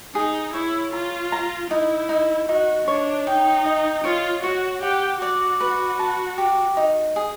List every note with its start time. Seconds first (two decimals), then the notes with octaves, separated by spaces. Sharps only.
0.15 D#4 G#4
0.54 E4 C#5
0.93 F4 A#5
1.32 A#5
1.71 D#4 E4
2.09 D#4
2.49 D#4 F#4
2.88 D4 C#5
3.27 D#4 G5
3.65 D#5
4.04 F4 C#5
4.43 F#4 C#5
4.82 G4 F#5
5.22 F#4 D5
5.61 B4
5.99 A5
6.38 G4
6.77 D#4
7.16 G#4